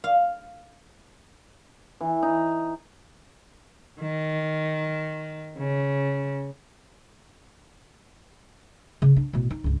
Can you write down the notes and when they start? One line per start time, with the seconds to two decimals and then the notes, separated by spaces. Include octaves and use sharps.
0.04 F5
2.00 E3
2.22 D#4
4.02 D#3
5.58 C#3
9.02 C#3
9.16 D4
9.33 A1 B2
9.51 D#4
9.64 C#2 G2